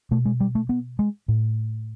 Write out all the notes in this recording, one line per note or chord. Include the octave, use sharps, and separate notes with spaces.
B2 A3
G#3
G3
A3
B3
G#3
A2